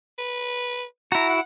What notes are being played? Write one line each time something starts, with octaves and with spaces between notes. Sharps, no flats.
B4
E4 F#4 A#5
F#5